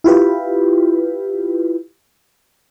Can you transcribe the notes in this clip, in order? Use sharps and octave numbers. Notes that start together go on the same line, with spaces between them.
E4 F4 G4 B4